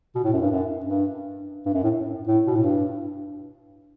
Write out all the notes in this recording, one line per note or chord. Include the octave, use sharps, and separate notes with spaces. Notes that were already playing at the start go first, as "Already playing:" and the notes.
B2
A2
F#2
G2
F#2
G2
G2
F#2
A2
A2
B2
A2
G2